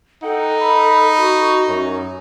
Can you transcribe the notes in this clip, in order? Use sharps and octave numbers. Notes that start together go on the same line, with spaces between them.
D#4 A4 F#5 G5
B5
F#4
F#2